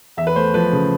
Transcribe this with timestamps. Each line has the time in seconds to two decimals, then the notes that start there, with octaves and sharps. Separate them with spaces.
0.17 E2 E5
0.27 B4
0.35 A3 C5
0.54 F3 B4
0.72 C#3